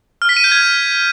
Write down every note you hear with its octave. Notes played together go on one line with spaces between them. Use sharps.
F6
B6
D#7
G6
G#6